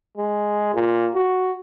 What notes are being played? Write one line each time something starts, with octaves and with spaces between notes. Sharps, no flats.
G#3
A#2
F#4